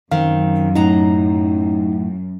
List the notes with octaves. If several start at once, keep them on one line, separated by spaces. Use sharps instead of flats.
F#2 D#3 C4 F5
A2 D#4 F#5 A#5